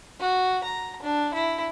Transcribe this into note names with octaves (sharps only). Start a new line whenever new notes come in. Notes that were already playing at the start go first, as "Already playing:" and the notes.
F#4
A#5
D4
E4